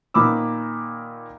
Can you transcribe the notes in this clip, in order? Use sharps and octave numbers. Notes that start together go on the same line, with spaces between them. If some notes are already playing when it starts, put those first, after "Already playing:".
A#2 D#3 B5 D6 E6